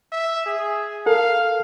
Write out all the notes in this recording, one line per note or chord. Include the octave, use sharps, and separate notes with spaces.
E5
G#4
A4 A#4 F5